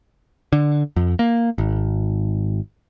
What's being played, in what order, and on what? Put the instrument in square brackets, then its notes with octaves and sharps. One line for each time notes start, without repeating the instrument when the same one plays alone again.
[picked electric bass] D3
F2
A#3
G#1